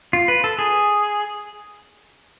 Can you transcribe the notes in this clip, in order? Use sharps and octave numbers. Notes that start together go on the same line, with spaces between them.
F4
B4
A4
G#4